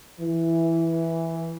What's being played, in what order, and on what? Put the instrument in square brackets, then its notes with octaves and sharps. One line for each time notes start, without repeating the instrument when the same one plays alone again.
[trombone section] E3